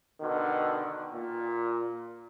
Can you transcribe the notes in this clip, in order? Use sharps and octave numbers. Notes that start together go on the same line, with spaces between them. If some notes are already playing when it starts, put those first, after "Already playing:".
B2 D3 D#3
A#2